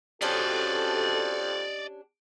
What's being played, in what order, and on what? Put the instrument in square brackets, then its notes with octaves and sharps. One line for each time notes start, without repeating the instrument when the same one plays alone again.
[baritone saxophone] F2 [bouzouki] C#4 D4 G4 [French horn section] F#4 A4 [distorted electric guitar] D5 D#5